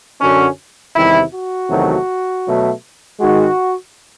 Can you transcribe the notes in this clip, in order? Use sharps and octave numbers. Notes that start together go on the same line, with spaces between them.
F#2 D3 F#3 C#4
E2 C3 D#3 G3 E4
F#4
E2 C3 D#3 F#3 A3
B2 F#3 A3
G#2 D#3 G#3 F#4